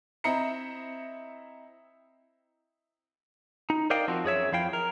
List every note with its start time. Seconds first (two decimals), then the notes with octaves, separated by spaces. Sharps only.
0.24 C4 E4 D#5 A#5 C#7
3.70 D#4
3.90 A#4 C5 D5 D#5 F5 G5
4.08 F3 C4 F#4
4.24 F#2 G#4 C#5 E5
4.52 F2 F3 E4 F5 G5
4.73 A#4